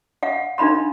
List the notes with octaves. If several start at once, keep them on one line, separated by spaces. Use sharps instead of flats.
F5 F#5
D4 D#4 F5 B5 C6